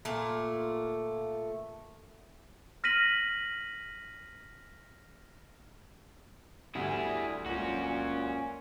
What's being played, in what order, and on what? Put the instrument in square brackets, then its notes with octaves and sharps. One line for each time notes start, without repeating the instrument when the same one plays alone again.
[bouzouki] A#2 A3
[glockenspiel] F6 A#6 B6 D#7 F#7
[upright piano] D2 [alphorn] G3 [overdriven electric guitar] E4 G#4
[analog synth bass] C#2 [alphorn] A#2 [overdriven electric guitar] C#4 F#4